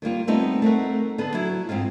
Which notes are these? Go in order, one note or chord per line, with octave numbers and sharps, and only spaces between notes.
D#3 G3 A#3 F4
G3 A3 B3 C4 D#4
A3 C4 A#4 F#5
D3 B3 G#4 A4
F#3 E4
G#2 C4 D#4 F4